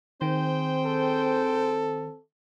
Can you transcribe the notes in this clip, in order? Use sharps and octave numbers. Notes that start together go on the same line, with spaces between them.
D#3 C4 G#4 C5 G5
A4